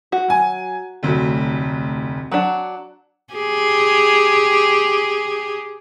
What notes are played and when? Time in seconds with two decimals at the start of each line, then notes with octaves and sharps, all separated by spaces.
0.12 F#4
0.28 F#3 G#5
1.03 F1 D2 F#3
2.32 F#3 D4 F#5
3.34 G4 G#4